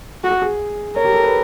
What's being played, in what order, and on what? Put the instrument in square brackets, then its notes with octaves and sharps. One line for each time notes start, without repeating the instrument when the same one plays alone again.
[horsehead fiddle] F#4
[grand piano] G#4
[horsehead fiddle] A#4 [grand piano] C#5
[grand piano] G4
A4
B4